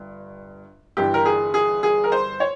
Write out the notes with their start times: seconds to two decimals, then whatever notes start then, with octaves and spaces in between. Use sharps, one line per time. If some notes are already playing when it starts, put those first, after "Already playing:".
Already playing: G1 G2
0.97 G1 G2 E3 G4
1.14 A#4
1.25 G#4
1.54 G#4
1.83 G#4
2.04 A#4
2.12 C5
2.40 C#5